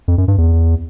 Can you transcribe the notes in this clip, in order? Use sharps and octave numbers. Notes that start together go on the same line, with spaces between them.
F2
F#2
G2
E2